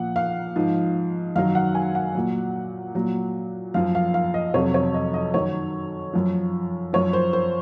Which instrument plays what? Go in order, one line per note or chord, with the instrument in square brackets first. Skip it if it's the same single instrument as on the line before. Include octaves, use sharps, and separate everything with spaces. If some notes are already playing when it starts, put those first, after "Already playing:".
Already playing: [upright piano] A#2 F3 F#5
F5
G#2 F3
F#2 D#3 F#3 F5
F#5
G#5
F#5
A#2 F#3
A#2 F#3
F#2 F3 F5
F5
F5
D#5
F2 C3 F#3 C#5
C#5
D#5
D#5
F#2 D#3 F#3 C#5
F#2 F3
F#2 F3 C#5
C5
C5